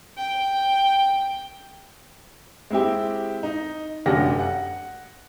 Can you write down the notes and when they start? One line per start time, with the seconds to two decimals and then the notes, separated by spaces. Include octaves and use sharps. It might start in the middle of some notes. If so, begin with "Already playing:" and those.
0.17 G5
2.70 G#3 C4 E4 G4
3.43 D#4
4.06 F1 F#2 D3 G4 F#5 A#6
4.40 F#5